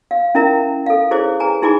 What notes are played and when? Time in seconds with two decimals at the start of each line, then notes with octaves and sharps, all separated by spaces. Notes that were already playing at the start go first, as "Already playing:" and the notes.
0.11 F5
0.35 C#4 E4 A#4 E5 A#5
0.86 A4 F5
1.11 E4 G#4 C5 C#5 D6
1.40 G#4 B4 G#5 A#5
1.62 D#4 E4 G#4 G#5 B5 D6